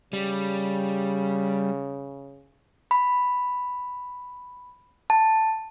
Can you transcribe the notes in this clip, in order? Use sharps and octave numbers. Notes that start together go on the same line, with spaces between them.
C#3 G3
B5
A5